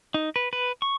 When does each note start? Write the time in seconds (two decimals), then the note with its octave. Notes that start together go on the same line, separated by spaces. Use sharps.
0.14 D#4
0.36 B4
0.53 B4
0.82 C#6